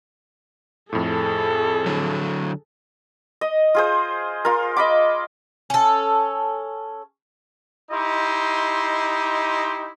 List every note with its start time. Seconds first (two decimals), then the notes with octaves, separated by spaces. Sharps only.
0.93 F2 A2 G#4 A4
1.86 D3 F#3
3.41 D#5
3.75 F4 G#4 C5
4.45 F4 A#4
4.77 D#5 B5 D6
5.70 C#4 A4
7.91 D#4 E4 G4 D#5 C6